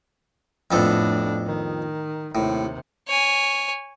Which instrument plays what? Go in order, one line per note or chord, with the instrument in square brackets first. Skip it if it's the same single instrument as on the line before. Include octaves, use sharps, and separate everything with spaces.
[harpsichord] F2 B3 A4 [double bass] A2 D4
[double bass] D#3
[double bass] D#2 C3 [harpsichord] A2
[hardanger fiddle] C#5 G#5